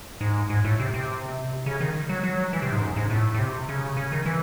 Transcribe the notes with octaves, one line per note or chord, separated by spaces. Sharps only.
G#2
G#2
A2
C3
C3
C#3
D#3
F#3
F#3
E3
C3
G#2
F#2
G#2
A2
A2
C3
C#3
C#3
D#3
E3